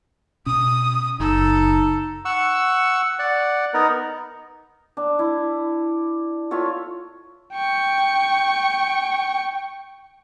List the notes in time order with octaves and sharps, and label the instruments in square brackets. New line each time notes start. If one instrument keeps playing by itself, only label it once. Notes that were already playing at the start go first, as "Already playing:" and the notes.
[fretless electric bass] B2 C#4 [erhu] D#6
[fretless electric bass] F#1 [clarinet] D#4 [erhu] A4
[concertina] F#5 C#6 E6
D5 F#5
B3 D#4 A#4
[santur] D4
E4
F4 A4 C#5 E5
[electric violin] G5 C#6